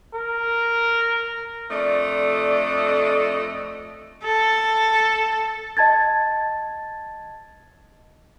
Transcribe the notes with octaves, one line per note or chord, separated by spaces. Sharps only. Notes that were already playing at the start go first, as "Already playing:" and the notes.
A#4
F2 A3 D4 D5 D#5
A4
D#5 A5 G#6 A6